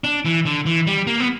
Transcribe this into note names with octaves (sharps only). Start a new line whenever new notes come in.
D4
E3
D3
E3
G3
A#3
B3